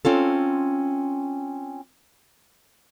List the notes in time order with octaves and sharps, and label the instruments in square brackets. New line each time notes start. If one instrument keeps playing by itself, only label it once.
[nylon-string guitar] C4 C#4 F4 A4